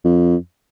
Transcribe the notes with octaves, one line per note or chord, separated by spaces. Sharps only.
F2